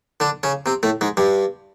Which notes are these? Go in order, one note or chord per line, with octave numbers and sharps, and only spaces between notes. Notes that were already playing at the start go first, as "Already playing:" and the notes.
D3 D4
C#3 C#4
C3 C4
A2 A3
G#2 G#3
G2 G3